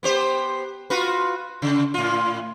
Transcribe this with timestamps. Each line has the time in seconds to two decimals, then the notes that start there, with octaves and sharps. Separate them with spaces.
0.03 B3 G4 C5
0.90 F4 F#4 B4
1.62 C#3
1.94 A2 F4